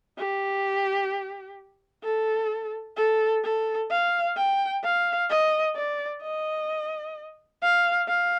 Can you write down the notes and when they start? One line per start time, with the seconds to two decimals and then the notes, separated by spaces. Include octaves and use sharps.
0.18 G4
2.03 A4
2.97 A4
3.44 A4
3.90 F5
4.36 G5
4.83 F5
5.30 D#5
5.75 D5
6.22 D#5
7.62 F5
8.08 F5